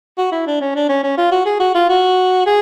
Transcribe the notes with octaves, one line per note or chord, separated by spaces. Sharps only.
F#4
E4
D4
C#4
D4
C#4
C#4
F4
F#4
G#4
F#4
F4
F#4
G#4